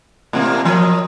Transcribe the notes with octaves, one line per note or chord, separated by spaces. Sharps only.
A2 C3 A#3
F3 A#4 D#5